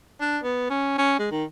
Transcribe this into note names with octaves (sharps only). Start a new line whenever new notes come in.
D4
B3
C#4
C#4
G#3
D#3